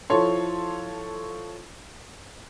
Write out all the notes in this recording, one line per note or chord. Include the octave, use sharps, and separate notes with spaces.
F3 E4 F4 A4 C#5 C6